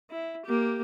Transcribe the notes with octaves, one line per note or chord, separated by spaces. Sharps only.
E4
A#3 G4